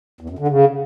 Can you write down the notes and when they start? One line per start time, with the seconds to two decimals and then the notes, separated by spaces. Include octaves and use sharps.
0.21 E2
0.30 F#2
0.39 D3
0.48 C#3